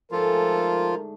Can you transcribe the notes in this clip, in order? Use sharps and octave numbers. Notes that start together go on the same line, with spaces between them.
G#2 D3 F3 A3 F4 A4 A#4